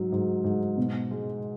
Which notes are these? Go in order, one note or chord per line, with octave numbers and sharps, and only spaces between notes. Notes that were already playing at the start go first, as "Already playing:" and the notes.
Already playing: G#2 F#3
G#2
G#2
B2
G#3